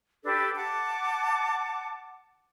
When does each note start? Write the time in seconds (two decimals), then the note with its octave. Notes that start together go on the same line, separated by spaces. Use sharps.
0.25 D4 G4 A4 B4
0.56 F#5 A5 D6